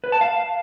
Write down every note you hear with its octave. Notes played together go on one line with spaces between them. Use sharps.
B4
A5
F5